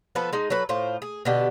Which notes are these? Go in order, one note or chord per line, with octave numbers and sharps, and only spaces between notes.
F3 B3 A4 B4
G#3 D#4
F#3 A4 B4
A2 F4 C5
G#4
B2 D3 G4